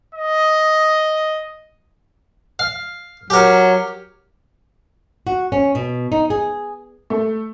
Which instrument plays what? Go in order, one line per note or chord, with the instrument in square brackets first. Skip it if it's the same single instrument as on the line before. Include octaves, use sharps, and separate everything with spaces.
[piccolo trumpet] D#5
[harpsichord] F5
[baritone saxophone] F#3 [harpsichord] G4 A#4
[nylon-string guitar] F#4
C#4
B2
D#4
G#4
[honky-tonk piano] A3